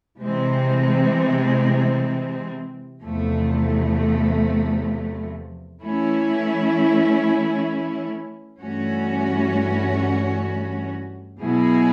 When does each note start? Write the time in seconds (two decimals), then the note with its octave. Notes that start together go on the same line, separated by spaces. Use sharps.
0.22 C3 E3 G#3 C4
3.02 E2 C3 F3 A3
5.81 E3 A3 C#4 E4
8.61 G2 E3 A3 C#4 F#4
11.41 B2 F#3 B3 E4 G#4